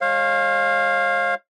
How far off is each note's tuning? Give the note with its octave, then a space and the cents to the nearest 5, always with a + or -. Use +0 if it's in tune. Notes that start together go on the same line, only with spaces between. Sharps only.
G#3 -35 C#5 -45 F5 +0